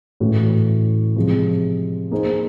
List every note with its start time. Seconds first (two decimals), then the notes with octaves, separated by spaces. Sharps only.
0.20 A2 E3 A3 C#4 F#4
1.16 C3 F3 G#3
2.11 A#3 D#4 G#4 C5